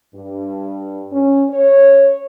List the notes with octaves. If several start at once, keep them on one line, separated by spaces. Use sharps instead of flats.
G2
C#4
C#5